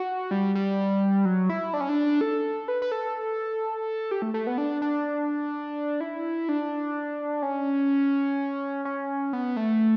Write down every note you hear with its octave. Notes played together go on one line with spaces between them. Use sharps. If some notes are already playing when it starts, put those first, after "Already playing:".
Already playing: F#4
G3
G3
F#3
E4
D4
C#4
D4
A4
B4
B4
A4
G4
A3
A3
B3
D4
D4
E4
D4
C#4
C#4
B3
A3